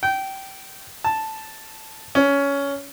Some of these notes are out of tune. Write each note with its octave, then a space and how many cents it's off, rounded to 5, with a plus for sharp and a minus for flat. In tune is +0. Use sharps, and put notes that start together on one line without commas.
G5 -20
A5 +0
C#4 +15